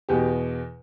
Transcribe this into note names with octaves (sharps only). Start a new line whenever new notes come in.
E2 B2 G4